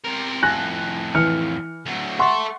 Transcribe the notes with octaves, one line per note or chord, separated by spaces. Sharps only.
C3 A#4
F2 A2 G#5 F#6 A#6
E3 F6 C#7
D2 F#3
A4 E5 F#5 C6 C#6